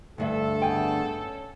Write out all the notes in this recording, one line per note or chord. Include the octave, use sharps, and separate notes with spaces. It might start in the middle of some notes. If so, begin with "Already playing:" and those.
D2 G2 A4 E5
A3 B3 G#4 G5 G#5
C#4